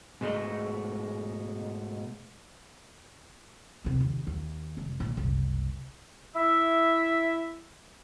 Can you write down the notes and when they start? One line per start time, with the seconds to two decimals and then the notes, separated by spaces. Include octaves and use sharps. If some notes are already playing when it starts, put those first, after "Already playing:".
0.21 G#2 B2 G#3 A3 D#5
3.84 D#2 C3
4.01 D#2
4.27 D#2
4.77 F1 G#3
5.00 A#2
5.17 F#1 C2
6.35 E4 E5